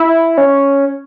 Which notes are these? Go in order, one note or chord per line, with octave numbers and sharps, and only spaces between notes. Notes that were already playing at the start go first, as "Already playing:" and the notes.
Already playing: E4
C#4